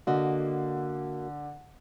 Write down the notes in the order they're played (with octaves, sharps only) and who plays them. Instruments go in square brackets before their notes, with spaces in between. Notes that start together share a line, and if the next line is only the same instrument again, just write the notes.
[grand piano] D3 [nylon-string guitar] A#3 F#4 D#5